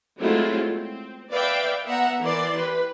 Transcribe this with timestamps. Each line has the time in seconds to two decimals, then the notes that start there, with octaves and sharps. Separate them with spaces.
0.20 F#3 G#3 A3 C4 E4 F4
0.73 C4
1.31 B4 D5 E5 F5 G5
1.85 B3 E5 F#5 A#5
2.22 E3 A#4 D5 C6
2.58 G4 B4